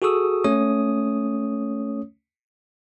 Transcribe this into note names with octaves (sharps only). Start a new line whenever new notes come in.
F#4 G#4 A4 C#6 D#6 E6
A3 C#4 C#5 D#6